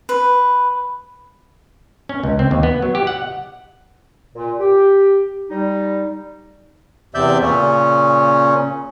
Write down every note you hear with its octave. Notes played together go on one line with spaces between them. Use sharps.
B4
C#4
C#2
C4
D#2
B3
F#3
G4
F#5
A#2
G4
G3 D#4
E2 C3 D5 E5 G6
A#2 C#3 C#4